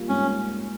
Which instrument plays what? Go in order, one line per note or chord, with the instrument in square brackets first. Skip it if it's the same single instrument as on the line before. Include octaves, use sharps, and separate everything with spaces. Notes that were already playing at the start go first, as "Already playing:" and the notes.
Already playing: [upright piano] G3 A#3 F4
[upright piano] G#2 [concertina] C#4